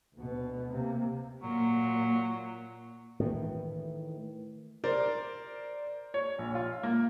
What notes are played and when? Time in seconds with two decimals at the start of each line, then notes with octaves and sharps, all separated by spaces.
0.15 D2 B2
0.72 C3 A#3
1.43 A#2 F#3
3.20 A2 D#3 E3
4.84 A#4 C5 D5
6.14 C#5
6.39 A#1
6.55 F4
6.83 A#3